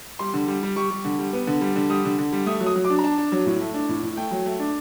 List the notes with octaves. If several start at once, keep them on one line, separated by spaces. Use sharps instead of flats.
G3 C6
D3
G3
G3
G3 C#6
G3
D3
G3
B3
D3
G3
D3
G3 D#6
D3
D3
G3
A3 D#6
F#3
D#6
F#3
D6
D4
A#5
D4 A5
D4
F#3
A2
A3
D4
A2
A2
A3 G5
F#3
A3
D4